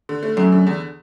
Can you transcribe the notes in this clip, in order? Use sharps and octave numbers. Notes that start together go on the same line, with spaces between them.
D3
A3
F#2 A3
D3
E2